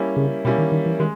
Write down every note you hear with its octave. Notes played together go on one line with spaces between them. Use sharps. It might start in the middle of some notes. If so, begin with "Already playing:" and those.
Already playing: G3 A#3 C#4 E4
C#3
B2 G3 A#3 C#4 E4
D#3
D#3
E3
D#3 G#3